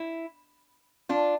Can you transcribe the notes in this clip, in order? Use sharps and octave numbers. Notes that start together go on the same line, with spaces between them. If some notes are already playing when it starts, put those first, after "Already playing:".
Already playing: E4
D4 F4